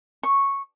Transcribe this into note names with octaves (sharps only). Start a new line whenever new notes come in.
C#6